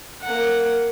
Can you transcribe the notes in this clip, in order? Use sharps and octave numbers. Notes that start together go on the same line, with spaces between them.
A#3 F#5